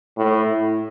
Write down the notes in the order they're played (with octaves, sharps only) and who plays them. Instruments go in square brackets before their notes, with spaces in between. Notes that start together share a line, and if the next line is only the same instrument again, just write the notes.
[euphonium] A2